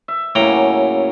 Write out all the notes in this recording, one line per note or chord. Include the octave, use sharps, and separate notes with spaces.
E5
A2 C#3 F#3 A#3 G5 A#5